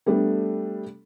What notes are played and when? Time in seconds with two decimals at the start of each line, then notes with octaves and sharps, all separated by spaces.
0.06 G3 A3 B3 D4 A4